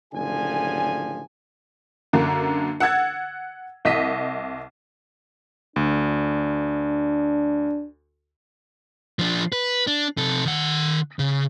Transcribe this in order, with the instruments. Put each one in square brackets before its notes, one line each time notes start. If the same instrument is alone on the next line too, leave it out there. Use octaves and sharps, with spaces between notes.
[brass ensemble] F#1 A2 D3 F3 G4 G#5
[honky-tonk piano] F#2 D3 A#3 D4
F#5 E6 G#6 A6
C2 D#5 B6 D#7
[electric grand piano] D2 [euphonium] D4
[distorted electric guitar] F3 D4
B4
D4
C3 A4
D#3 F#5
C#3